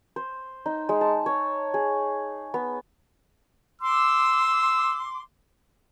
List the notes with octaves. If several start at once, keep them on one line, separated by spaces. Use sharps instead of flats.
C5
D#4
G#3
A5
C#5
G#4
B3
C6 D6 E6